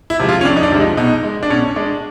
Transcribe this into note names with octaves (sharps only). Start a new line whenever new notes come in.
E4
C3 F3 G#3
F4
C#4
F2 D4
D#4
D4
C3 F3 G#3
D#4
B2 D#4
G#3
D4
B2 C#4
G#3 D4